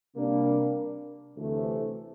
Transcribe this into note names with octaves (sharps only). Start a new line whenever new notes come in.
C3 G3 A#3 D4
D2 C3 E3 A3